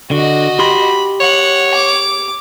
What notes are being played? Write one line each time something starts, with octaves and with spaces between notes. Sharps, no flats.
D3 F#4 D#5
G4 B5 C6
C#5 F#5
D6